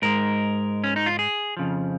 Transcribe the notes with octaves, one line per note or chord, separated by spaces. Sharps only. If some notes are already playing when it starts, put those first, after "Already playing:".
G#2 G#3 A#4
C#4
D#4
F4
G#4
F2 C#3 F3